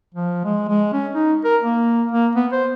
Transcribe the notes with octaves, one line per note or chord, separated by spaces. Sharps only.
F3
G#3
G#3
C#4
D#4
A#4
A#3
A#3
B3
C5